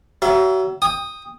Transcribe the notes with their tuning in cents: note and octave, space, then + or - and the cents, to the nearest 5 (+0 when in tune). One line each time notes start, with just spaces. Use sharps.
F#3 +35 E5 +45
G5 +25 D#6 +0